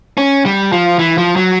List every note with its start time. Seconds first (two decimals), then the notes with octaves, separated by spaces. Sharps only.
0.17 C#4
0.46 G3
0.73 F3
0.99 E3
1.18 F3
1.36 F#3